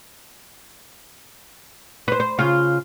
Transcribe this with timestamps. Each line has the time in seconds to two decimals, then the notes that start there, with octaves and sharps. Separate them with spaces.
2.08 B4 C5
2.20 C5
2.39 C#3 F4